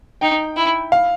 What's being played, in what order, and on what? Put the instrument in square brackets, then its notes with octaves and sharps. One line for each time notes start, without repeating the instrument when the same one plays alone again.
[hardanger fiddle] D#4 [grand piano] G5
[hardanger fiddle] E4
[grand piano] F5